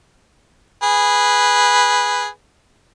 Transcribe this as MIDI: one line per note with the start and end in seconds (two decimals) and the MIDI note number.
0.83 2.27 68
0.83 2.27 71